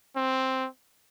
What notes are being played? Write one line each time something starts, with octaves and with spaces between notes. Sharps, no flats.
C4